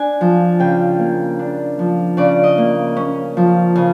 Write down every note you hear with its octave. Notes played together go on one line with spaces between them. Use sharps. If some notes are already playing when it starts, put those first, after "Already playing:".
Already playing: D4 G#5
F3
C#3 G5
A#3
D4
F3
C#3 D5
D#5
A#3
C#4
F3
C#3